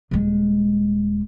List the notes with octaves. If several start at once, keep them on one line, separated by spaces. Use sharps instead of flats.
D#1 G#3